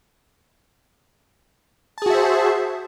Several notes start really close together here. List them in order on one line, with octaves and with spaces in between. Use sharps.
A5 G#4 F#4 E5 C5